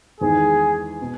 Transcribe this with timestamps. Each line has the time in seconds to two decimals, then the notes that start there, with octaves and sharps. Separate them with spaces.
0.21 E2 D#3 G#3 D#4 G#4
1.02 B2